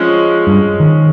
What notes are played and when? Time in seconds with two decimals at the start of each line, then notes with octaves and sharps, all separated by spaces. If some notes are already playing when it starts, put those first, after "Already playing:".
Already playing: F3 G#3 C#4
0.47 G2
0.80 D#3